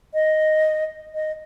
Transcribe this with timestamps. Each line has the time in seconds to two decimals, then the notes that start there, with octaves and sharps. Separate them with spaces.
0.14 D#5
1.14 D#5